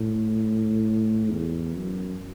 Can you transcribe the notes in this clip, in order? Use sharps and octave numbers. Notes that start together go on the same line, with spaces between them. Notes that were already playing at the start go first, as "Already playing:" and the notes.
Already playing: A2
E2
F#2